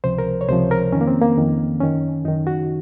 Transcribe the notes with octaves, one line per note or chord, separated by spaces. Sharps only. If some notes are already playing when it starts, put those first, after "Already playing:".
C#2 C3 F3 C5
A#4
C#5
C#2 C3 F3 C5
A#4
F2 D#3 C#4
A#3
C4
A#3
F2 D#3
F#2 D#3 C#4
F#2 D#3 D#4
F#4